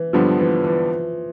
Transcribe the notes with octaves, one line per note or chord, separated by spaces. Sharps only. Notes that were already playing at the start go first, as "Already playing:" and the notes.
Already playing: E3
G2 D3 F3 G3 B3 D4
E3
E3